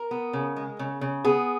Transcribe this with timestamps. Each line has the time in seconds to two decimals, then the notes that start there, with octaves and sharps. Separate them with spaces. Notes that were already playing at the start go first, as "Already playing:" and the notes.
Already playing: A#4
0.11 B3
0.33 C#3
0.56 G#3
0.79 C#3
1.01 C#3
1.25 B3 G#4